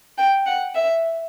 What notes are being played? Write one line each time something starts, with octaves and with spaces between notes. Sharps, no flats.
G5
F#5
E5